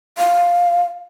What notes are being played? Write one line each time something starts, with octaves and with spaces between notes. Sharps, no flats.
F5